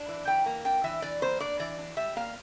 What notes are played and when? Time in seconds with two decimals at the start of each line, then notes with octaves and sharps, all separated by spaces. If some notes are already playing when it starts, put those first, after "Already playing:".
Already playing: D4
0.08 E3
0.27 E3 G5
0.46 A#3
0.65 D4 G5
0.84 E3 E5
1.02 E3 D5
1.22 A#3 C5
1.40 D4 D5
1.59 E3 D5
1.78 D4
1.97 G3 E5
2.16 A#3 F5